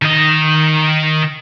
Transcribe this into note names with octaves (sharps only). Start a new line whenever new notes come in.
D#3 D#5